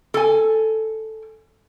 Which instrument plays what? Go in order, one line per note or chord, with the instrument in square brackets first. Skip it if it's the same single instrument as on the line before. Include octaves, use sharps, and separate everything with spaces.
[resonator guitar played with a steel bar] A4 G#5